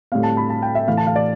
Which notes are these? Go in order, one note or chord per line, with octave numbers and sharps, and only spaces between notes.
A2 G3 C4 F5
A5
B5
A5
G5
E5
A2 E3 A3 F5
A5
F5
D5